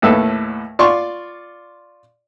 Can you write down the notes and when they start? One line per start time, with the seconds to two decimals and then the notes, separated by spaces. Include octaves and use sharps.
0.02 D#2 A2 A4 B4 E6
0.79 F4 D5 C6 C#6